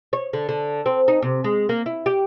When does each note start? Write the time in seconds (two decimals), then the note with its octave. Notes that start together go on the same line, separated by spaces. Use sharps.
0.13 C#5
0.33 D3
0.49 D3
0.86 C4
1.08 D#4
1.22 C3
1.44 G#3
1.69 A#3
1.86 E4
2.06 G4